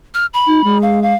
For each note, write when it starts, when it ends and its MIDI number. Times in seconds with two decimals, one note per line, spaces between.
0.14 0.26 89
0.34 0.78 83
0.47 0.64 63
0.64 1.13 56
0.82 1.02 77
1.02 1.15 77